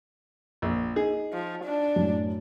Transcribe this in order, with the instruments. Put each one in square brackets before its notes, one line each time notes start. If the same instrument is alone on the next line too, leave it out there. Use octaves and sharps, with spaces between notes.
[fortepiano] A#1
[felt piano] D#4 [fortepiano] G#4
[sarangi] F3
D4
[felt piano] F#2 A2